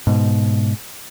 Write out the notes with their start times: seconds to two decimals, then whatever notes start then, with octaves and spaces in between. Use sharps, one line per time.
0.07 G#2 B2